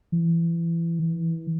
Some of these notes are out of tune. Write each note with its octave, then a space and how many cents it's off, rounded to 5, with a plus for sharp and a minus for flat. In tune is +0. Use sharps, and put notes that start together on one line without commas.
E3 +25
E3 -20